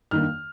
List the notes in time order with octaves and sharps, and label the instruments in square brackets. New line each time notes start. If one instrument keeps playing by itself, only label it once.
[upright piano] G2 D#3 A#3 F6